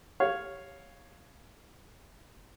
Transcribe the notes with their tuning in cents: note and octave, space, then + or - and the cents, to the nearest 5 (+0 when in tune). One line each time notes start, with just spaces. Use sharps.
C#5 +0 F5 +0